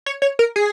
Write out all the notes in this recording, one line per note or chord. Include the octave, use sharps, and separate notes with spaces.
C#5
C#5
A#4
G#4